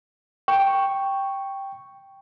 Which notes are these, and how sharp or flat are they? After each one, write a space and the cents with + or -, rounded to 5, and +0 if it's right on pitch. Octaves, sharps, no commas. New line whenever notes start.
G5 +0 C#6 +0